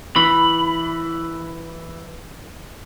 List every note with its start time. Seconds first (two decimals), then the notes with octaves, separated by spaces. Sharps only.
0.16 E3 B5